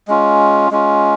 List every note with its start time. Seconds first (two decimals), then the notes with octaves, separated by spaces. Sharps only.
0.08 G#3 C#4 F4
0.71 G#3 C#4 F4